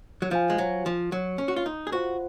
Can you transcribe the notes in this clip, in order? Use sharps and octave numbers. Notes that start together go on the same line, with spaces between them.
F#3
F3 F4 C5 F5 G#5
G#3
F#3
F3
F#3
C#4
F#4
F4
D#4
G#4
F4 F#4 C5 F#5